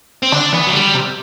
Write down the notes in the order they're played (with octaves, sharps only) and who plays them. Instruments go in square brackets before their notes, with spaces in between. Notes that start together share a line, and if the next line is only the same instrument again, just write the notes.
[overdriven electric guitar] C4
[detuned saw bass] D3 [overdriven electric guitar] D4
[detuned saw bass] E3 [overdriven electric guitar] B3
[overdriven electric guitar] F#3
[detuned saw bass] D3 [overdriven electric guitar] G3
[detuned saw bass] C3